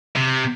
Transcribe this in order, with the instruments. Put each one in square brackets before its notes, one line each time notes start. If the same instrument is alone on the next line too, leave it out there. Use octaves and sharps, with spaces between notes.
[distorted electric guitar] C3